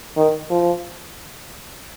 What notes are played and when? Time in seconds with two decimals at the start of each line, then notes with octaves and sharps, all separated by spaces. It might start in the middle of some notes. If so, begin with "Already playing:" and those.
0.17 D#3
0.50 F3